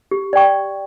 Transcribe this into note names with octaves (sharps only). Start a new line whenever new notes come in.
G4
D5 G5 C#6